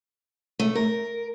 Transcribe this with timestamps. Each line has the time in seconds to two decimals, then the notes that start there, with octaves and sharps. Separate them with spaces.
0.59 A3
0.75 A#4